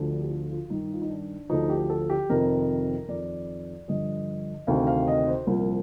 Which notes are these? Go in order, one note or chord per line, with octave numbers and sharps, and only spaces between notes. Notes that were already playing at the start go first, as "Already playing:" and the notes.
Already playing: D2 D3 F3
D4
G4
F4
F4
G2 D#3 D#4
F4
D#4
D4
D2 D3 F3 D#4
G4
A4
G4
F2 C3 D#3 A#4
F2 D#3 D5
G2 D3 F3 D#5
D2 C3 D#3 F5
F5
D#5
C5
C2 A#2 F3 A#4